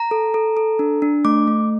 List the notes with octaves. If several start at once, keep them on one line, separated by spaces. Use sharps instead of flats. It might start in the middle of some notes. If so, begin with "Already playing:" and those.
Already playing: A#5
A4
A4
A4
D4
D4
A3 D6
A3